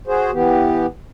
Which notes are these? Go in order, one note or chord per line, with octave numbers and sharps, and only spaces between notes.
F#4 G#4 C5
E3 B3 G4